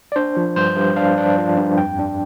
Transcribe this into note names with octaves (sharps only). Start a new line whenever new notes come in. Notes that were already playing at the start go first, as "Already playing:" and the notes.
D5
D4 C5
F3
G2 C5
G2
D4 F5
D4
F3
G2
F2 G5
D4